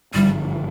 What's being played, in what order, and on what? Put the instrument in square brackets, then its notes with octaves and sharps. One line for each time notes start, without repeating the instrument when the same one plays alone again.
[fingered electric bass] G#1 G2 D3 F3 [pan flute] G3